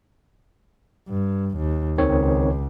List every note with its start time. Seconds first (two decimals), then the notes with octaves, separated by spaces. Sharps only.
1.08 G2
1.57 D#2
1.98 C#2 D#3 C4 C#5